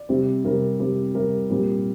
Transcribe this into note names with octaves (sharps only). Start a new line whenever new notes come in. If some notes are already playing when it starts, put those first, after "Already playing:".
Already playing: D5
C3 G3 C4
C3 G3 C4 A#4
C3 G3 C4
C3 G3 C4 A#4
A#2 G3 C4